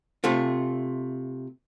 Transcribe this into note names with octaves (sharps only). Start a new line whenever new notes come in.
C3 A3 F4